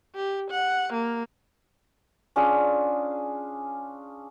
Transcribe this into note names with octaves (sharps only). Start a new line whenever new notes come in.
G4
F#5
A#3
C#4 D4 F4 G#4